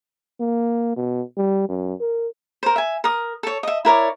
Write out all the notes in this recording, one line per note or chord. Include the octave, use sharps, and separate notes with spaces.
A#3
B2
G3
F#2
A#4
A#4 C5
E5 G#5
A#4 D#6
A4 C#5
D#5 E5
E4 A#4 C#5 D5